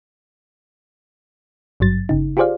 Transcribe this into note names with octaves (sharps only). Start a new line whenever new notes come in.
G#1 G2 F#3 A6
G1 C#3 D#4
F4 G4 G#4 C5 D5 F5